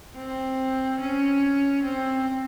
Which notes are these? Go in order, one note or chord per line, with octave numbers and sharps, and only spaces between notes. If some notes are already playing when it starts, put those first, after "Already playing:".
C4
C#4
C4